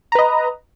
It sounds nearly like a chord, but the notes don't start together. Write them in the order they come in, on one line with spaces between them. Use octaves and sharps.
A#5 B4 D#5